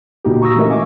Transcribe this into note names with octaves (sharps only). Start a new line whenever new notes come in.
A#2 D3 A#3 D#4 F#4 G4
A#5 C#6 D#6 E6 A#6
E3 A3 C#4 A#4 D#5 E5
E5 F5 G#5 C#6 D6